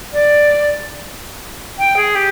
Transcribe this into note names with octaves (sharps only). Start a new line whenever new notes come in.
D5
G5
G#4
G4